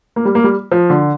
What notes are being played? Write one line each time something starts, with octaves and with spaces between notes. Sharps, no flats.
A#3
G3
A#3
G3
F3
D3